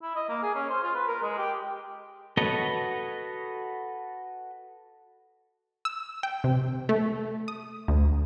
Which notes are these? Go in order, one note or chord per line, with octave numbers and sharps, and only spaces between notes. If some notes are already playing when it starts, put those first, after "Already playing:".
E4
D#5
A#3
G#4
C#4
C5
F4
B4
A#4
G#3
G4
F#4 A4 B4 C#5 D#5
E6
G5
C3
A3
D#6
D2